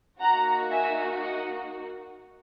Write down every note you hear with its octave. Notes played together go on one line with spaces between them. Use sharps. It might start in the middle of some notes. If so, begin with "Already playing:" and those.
A#3 D#4 F#4 F#5 A#5
E5 G#5
D#5 F#5